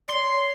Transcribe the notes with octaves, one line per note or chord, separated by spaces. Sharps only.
C#5 D5 C6